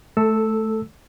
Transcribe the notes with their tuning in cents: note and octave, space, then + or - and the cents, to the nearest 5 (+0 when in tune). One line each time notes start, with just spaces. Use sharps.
A3 -15 A4 +10 E6 -5